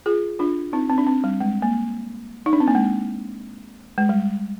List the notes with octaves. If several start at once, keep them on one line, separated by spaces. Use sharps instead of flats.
F4 G#4
D4 F4
C4 D#4
C4
D4
C4
G3
G#3
A#3
D#4
D4
C4
A#3
G#3
G#3
G3